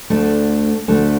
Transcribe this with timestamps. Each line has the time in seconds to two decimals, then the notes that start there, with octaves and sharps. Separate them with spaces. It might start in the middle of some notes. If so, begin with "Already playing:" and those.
0.10 D2 D3 A3 D4
0.88 D2 D3 A3 D4